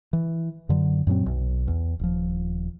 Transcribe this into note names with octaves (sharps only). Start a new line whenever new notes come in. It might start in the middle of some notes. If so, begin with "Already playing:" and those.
E3
F#2 D3 F#3
F#2 A#2 F#3 C4
B1
E2
D#1 F3